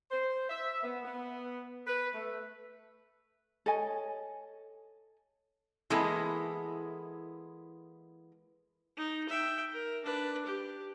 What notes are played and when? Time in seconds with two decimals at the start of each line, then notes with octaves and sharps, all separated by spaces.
0.11 C5
0.49 E5
0.83 B3
1.05 B3
1.87 B4
2.14 A3
3.66 A4 C#5 D#5 G#5
5.90 E3 G#3 A#3 B3 E4 A4
8.97 D#4
9.29 E5 G5
9.73 A#4
10.04 D4 B4
10.46 G4